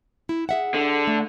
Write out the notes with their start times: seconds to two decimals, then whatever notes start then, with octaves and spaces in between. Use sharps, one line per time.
0.29 E4
0.49 G#4 E5 F#5
0.74 D3
1.07 A3